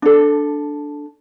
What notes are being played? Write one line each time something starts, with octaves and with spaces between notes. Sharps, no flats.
D4 A4